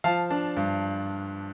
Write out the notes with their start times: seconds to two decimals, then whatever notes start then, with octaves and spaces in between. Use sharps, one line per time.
0.04 F3 F5 A5
0.31 D4
0.57 G2